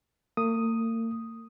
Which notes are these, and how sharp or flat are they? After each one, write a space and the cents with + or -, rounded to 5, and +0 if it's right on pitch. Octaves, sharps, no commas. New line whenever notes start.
A#3 -45 D#6 +0